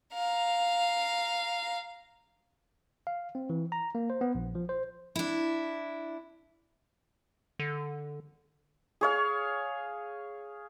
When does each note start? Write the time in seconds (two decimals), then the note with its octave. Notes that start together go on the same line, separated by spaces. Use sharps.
0.14 F5 A#5
3.07 F5
3.35 C4
3.50 E3
3.72 A#5
3.95 A#3
4.10 C5
4.21 B3
4.35 A#1
4.55 F3
4.69 C5
5.16 D4 E4
7.59 D3
9.01 G#4 C#5 F5